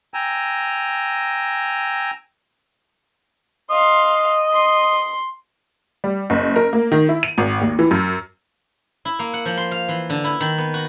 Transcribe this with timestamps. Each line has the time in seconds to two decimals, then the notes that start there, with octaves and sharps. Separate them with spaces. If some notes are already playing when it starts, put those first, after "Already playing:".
0.14 G5 G#5 A#5 E6
3.70 D#5 F5 C6
4.53 C6
6.04 G3
6.30 F#1
6.56 A#4
6.73 A#3
6.92 D#3
7.09 E4
7.23 D#7
7.38 G#1
7.61 D#2
7.79 E3
7.91 F#2
9.05 E4
9.19 A#3
9.33 F#5
9.45 F3
9.57 C6
9.71 F5
9.88 E3
10.10 D3
10.24 E4
10.41 D#3
10.58 B3
10.74 F#4